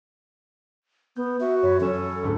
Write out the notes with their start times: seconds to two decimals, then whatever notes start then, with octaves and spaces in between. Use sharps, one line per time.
1.16 B3 G6
1.40 F#4 E5
1.62 F#2 C#5 B5
1.80 F#3 C#4 A4 G#5 E7
2.23 D2 G#2 A3